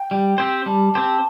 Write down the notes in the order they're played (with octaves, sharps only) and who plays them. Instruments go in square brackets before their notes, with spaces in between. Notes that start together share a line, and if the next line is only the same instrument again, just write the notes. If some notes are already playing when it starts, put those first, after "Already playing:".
Already playing: [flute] G5
[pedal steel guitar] G3
C4 G4 C5
[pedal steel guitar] G3 [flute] A5
[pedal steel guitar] C4 G4 C5